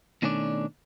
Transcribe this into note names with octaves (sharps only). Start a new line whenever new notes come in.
B2 D#3 A3 C#4 D4 D5